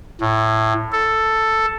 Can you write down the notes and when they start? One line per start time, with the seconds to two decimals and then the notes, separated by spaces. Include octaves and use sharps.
0.21 A2
0.92 A4